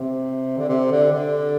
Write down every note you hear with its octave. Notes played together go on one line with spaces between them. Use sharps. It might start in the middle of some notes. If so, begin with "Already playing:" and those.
Already playing: C3
D3
C3
D3
D3